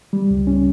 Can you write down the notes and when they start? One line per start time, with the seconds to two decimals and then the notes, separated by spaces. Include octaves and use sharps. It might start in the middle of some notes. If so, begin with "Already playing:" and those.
0.13 G3
0.31 C#2
0.47 C#4